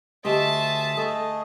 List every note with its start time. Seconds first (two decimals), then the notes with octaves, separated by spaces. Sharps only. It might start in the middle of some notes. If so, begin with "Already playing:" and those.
0.25 D2 G4 G#4 D#5 E5 A5 C6 D#6
0.97 A3 G#4 A4 D#5